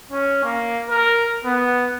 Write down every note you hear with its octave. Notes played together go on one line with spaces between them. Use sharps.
C#4
A#3
A#4
B3